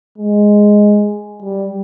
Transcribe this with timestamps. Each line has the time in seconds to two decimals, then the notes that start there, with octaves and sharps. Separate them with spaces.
0.18 G#3
1.42 G3